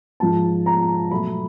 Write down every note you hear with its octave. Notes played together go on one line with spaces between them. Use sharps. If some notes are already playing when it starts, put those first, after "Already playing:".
G#2 F3 G#3 A5
A#5
B2 F#3 A3 B5